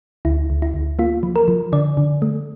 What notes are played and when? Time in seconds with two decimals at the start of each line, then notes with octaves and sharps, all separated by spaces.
0.25 D2 E4
0.50 D2
0.62 E4
0.74 D2
0.99 A#3 F4
1.23 F3
1.36 A#4
1.48 F3
1.72 D3 D5
1.97 D3
2.22 A3